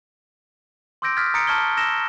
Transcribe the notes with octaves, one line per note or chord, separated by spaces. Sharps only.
C6 D6 E6 G6 A#6 D7
D#6 F6 F#6 G#6 A6 B6
A#5 D#6 A6 B6 C#7 D7
A5 C#6 F6 G#6 A6 G7
E6 A#6 E7 G7